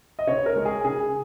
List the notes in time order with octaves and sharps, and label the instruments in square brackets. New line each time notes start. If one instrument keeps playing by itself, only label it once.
[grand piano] D#5
C#3 C#5
A#4
G#3
G#4
C#3 G#4